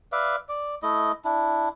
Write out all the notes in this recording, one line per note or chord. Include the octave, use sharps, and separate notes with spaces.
B4 D5 E5 F5
D5
A3 E4 D#5
D4 E4